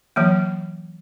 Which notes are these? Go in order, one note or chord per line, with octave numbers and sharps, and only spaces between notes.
E3 F#3 A#3